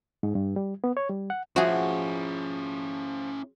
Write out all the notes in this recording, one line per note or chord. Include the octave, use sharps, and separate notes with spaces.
G#2
G2
G3
B3
C#5
G3
F#5
F3 C#4 E4 F#4 G#4 E5